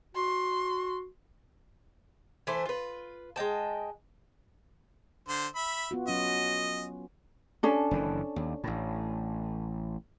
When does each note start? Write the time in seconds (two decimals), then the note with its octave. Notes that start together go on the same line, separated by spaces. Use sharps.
0.15 F#4 C6
2.47 E3 A3 C5
2.65 F4 B4
3.36 G#3 D#5 G5 A5
5.28 D3 C5
5.55 E5 B5
5.91 B3 F4 F#4
6.08 F#3 C#4 D#5
7.63 C#4 D4 A4
7.91 F#1 D#3 E3
8.36 D#2
8.64 A1 A2